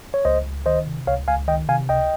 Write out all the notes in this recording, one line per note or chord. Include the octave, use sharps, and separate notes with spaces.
C#5
C#2 C5 D#5
C#2
D#3 C5 D#5
C3
C#2 C#5 F5
C#2 F5 G#5
D#3 D#5 G5
C3 F5 G#5
C#2 D#5 G5